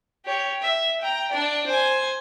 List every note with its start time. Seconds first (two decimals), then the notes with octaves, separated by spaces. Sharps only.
0.25 G4 C#5
0.62 E5
1.01 G5 A#5
1.31 D4 D5
1.66 C5 G#5